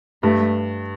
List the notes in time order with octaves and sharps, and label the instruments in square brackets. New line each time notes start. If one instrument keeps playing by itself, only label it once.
[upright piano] G2 [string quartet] A3